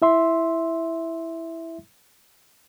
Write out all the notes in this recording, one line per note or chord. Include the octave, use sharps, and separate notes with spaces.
E4 E5 C6